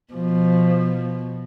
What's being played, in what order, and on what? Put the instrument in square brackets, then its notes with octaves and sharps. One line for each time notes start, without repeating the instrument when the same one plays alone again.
[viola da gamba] B2 [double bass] F3